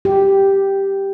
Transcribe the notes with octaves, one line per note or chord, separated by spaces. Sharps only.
G4